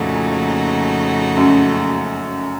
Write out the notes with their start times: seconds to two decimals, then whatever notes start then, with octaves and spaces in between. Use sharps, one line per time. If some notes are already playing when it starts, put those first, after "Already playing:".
Already playing: F2 A#2 C#3 A3 D#4 F#4
1.37 F#2